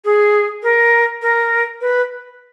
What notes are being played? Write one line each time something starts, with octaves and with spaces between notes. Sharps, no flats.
G#4
A#4
A#4
B4